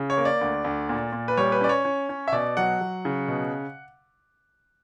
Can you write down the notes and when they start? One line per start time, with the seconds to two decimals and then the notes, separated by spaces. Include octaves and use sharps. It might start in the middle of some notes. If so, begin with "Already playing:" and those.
Already playing: C#3
0.10 C#5
0.17 A#3
0.25 D5
0.41 D2
0.64 D2
0.89 A#2
1.12 A#2
1.28 B4
1.37 G3 C#5
1.52 B4
1.61 C#4 D5
1.69 C#5
1.85 C#4
2.09 C#4
2.28 E5
2.32 B2 D5
2.57 F#3 F#5
2.81 F#3
3.05 C#3
3.28 B2